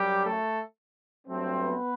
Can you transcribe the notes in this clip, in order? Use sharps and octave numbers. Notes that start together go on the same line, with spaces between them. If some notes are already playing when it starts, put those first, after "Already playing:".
Already playing: F#2 F#3 G3 G4
A3 A4
G2 F#3 A3 C4
B3 B4